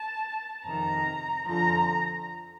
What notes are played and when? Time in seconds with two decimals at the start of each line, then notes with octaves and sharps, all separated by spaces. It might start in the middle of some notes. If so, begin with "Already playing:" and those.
Already playing: A5
0.65 F2 C3 D#3 A#5
1.46 F2 D3 F3 A#5